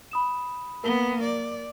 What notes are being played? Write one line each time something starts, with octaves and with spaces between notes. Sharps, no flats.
B5 D#6 E7
A#3 B3 A#4 G7
D5